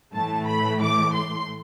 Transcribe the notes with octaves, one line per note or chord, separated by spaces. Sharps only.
A2 E3 A3 A5
B5
D6
C6